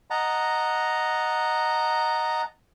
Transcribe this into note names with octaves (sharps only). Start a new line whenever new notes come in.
D#5 F#5 A5 A#5